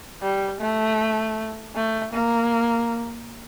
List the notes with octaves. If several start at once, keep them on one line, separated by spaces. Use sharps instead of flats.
G3
A3
A3
A#3